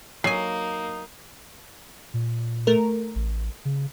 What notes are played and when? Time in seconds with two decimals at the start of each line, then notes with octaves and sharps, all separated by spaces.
0.24 F#3 A#3 D#4 G#5 C7
2.14 A#2
2.67 A3 A#4
3.16 A1
3.65 C#3